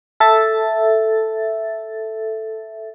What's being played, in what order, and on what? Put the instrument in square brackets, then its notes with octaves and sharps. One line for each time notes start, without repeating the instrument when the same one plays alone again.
[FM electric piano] A4 E5 A6